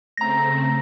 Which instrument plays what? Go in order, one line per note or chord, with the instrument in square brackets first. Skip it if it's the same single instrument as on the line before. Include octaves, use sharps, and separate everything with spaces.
[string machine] C#3 A3 C4 [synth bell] A#5 A#6